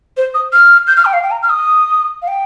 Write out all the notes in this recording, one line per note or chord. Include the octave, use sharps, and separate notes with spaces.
C5
D#6
F6
G6
F6
G5
F5
G5
A#5
F6
D#6
F5
G5